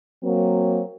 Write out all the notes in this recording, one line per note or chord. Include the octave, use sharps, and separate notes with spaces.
F#3 A#3 C4